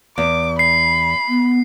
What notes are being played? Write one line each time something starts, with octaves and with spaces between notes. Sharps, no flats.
E2 D6
B5 C7
B3